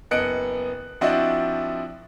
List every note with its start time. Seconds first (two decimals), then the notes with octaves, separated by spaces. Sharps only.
0.11 F#1 B3 D#5 F#6 C#7 D7
1.01 F3 C4 D4 E4 F#4 D#5